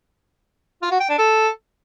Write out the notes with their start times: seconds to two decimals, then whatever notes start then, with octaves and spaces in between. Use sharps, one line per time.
0.82 F4
0.91 F#4
1.00 G5
1.09 D4
1.18 A4